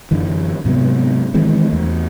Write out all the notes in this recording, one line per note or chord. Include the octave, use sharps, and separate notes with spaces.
F#2 D3 E3
G#2 C3 F#3 B3
D#3 E3 G#3 C4
E2 A3